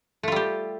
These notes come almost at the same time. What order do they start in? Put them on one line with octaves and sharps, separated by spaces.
A3 F4 G3 G4